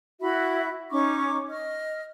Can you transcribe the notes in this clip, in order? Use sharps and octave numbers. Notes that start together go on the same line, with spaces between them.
E4 F#4 E5 B5
C#4 D#4 C#6 D6
D#5 F6